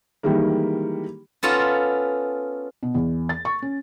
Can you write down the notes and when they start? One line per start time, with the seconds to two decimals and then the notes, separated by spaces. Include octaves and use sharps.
0.23 D#3 E3 G3 G#3 A#3
1.43 B3 C#4 F4 A4 A#5
2.83 B2
2.95 E2
3.29 A6
3.45 C#6
3.62 C#4